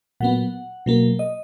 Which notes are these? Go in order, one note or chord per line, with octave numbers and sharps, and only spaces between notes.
A#2 F#3 B3 F#5
B2 F#3 A#3
D#5